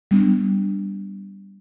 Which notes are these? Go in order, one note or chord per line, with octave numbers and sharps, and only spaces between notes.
G3 B3 D4